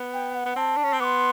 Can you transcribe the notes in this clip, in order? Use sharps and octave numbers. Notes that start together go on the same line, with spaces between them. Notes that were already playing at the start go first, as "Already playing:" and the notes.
Already playing: B3
G5
F#5
B3
C4 A5
D4
C#4
C4
B3 C6 D6